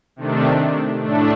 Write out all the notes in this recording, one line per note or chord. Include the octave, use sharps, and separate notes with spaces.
C3 D#3 A3 D4
A2 A3 D4